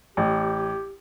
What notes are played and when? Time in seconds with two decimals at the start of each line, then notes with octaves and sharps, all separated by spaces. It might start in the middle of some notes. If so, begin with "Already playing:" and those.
0.17 A1 G4